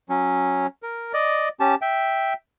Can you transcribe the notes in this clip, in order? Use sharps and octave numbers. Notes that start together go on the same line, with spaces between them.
F#3 C#4
A#4
D5 D#5
C#4 G4 A5
E5 G5